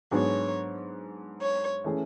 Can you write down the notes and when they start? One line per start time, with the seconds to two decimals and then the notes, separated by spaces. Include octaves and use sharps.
0.11 G#2 F#3 B3 D4 G#4 C#5
1.42 C#5
1.84 E3 A3 C#4 G#4